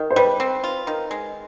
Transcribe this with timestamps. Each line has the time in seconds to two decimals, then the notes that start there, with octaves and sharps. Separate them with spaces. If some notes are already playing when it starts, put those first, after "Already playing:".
Already playing: D#3
0.10 C5
0.16 G3 B4
0.40 C4
0.64 F4
0.87 D#3
1.11 G#3